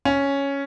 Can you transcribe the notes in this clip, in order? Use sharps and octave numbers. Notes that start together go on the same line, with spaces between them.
C#4